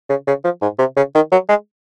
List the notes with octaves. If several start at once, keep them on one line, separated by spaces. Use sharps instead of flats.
C#3
C#3
F3
G#2
C3
C#3
D#3
F#3
G#3